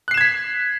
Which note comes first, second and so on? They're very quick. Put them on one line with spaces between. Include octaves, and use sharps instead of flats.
F#6 C7 E7 G#6 B6